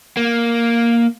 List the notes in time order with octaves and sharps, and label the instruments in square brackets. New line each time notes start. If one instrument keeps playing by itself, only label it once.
[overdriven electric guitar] A#3